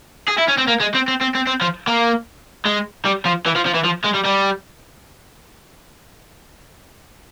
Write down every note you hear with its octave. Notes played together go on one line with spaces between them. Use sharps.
G#4
E4
C#4
C4
A#3
G#3
C4
C4
C4
C4
C4
F3
A#3
G#3
G3
F3
E3
F3
F3
E3
F3
G#3
G3
G3